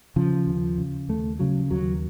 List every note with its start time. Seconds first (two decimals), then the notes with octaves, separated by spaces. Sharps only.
0.16 C#3 F3
0.47 D#2
0.78 C#3
1.09 D#2 A3
1.39 C#3 F#3
1.71 D#2 F#3